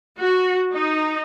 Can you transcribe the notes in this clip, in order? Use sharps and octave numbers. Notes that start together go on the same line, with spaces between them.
F#4
D#4